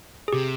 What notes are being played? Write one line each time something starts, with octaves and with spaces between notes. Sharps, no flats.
G#4
C3 G4